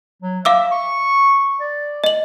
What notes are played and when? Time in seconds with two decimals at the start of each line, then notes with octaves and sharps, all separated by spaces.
0.22 F#3
0.45 E5 F5 D6 E6
0.72 C#6
1.60 D5
2.04 D#5 F#7